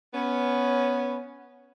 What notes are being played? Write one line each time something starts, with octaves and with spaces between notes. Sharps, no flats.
B3 C#4